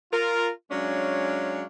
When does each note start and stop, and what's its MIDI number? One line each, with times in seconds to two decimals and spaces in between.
0.13 0.50 65
0.13 0.50 70
0.71 1.65 54
0.71 1.65 56
0.71 1.65 61
0.71 1.65 62
0.71 1.65 77